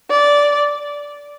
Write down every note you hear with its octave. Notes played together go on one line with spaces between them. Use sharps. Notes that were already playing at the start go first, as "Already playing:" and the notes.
D5